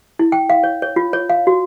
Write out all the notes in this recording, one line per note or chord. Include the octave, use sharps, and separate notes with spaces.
E4
G5
F5
C#5
C#5
F4
C#5
F5
F#4